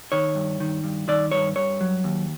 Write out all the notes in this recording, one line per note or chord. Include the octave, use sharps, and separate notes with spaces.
D#3 C#5
G2
D#3
G2
D#3 D5
G2 C#5
G2 C#5
F#3
D#2